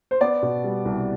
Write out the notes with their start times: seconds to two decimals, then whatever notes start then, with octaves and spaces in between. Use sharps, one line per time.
0.11 C5
0.21 B3 D5
0.43 B2
0.64 G3
0.85 C2